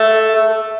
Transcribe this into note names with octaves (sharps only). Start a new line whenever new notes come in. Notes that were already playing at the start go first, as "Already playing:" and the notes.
Already playing: A3